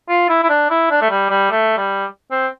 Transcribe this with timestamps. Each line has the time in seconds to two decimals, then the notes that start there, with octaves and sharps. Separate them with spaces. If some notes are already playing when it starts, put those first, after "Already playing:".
0.09 F4
0.29 E4
0.43 E4
0.50 D4
0.71 E4
0.91 D4
1.01 A3
1.10 G3
1.30 G3
1.51 A3
1.77 G3
2.31 C4